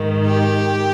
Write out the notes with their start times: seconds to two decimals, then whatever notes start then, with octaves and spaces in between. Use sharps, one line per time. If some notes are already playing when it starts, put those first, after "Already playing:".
Already playing: G#2 D#3
0.27 G4